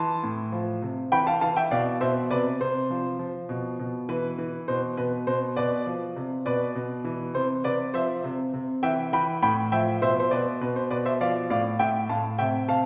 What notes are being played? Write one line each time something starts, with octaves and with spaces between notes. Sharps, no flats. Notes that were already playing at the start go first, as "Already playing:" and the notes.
Already playing: E3 A5 C6
A2
F3
C3
E3 G5 B5
F5 A5
E3 F5 A5
E5 G5
B2 D5 F5
B2 C5 E5
C3 B4 D5
C3 C5
F3
F3
B2
B2
E3 B4
E3
B2 C5
B2 B4
B2 C5
B2 B4 D5
F3
C3
B2 B4 D5
B2
E3
C3 C5
C3 B4 D5
F3 C5 E5
C3
C3
E3 E5 G5
E3 G5 B5
A2 G5 B5
F3 E5 G5
B2 C5 E5
C5
B2 B4 D5
B2 B4
C5
B2 B4 D5
C5 E5
F3 D5 F5
A2 D5 F5
A2 E5 G5
A2 F5 A5
C3 E5 G5
C3 F5 A5